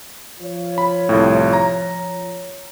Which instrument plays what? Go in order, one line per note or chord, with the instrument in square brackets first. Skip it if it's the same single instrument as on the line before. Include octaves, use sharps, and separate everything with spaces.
[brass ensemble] F3 F4 C#5
[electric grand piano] B5
C2 A2
A#5